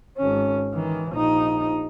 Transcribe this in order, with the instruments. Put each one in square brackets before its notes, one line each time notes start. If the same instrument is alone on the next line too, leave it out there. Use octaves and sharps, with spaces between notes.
[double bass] G#1 C#4
D#3 E3
A#1 D#4